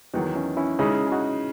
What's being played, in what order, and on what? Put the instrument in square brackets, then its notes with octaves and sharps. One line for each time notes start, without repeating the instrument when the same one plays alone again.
[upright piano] E2 D#3 F#3 [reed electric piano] D#4 F#4
[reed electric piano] C#4 E4
C#4 E4
[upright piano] C#3 G#3 D#4 [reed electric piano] C#4 E4
[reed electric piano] G#4
D#4 F#4